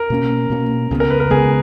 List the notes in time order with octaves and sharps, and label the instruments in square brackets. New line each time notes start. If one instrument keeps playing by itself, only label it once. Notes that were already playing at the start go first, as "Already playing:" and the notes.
Already playing: [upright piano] A#4
[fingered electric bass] B2 A#3 C#4
B2 A#3 C#4
C#2 C#3 G#3 B3
[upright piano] A#4
B4
A#4
[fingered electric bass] C#2 C#3 G#3 B3 [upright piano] G#4